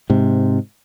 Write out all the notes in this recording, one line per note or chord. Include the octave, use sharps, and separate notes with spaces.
G#2 C3